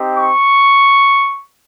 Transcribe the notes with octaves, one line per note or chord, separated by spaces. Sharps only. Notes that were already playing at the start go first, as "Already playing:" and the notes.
Already playing: C4 D#4 G4
C#6